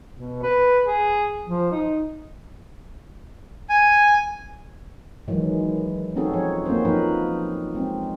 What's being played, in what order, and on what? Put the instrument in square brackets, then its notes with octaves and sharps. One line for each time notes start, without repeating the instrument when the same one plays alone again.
[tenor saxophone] B2
B4
G#4
F3
D#4
[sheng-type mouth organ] G#5
[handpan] D#3 E3 F#3 G#3
C4 C#4 D#4 F#4 G#4 A4
F3 C#5
A#3 C4 C#4 F#4 C5
F3 A#3 D#4 A#4 B4
G#3 C4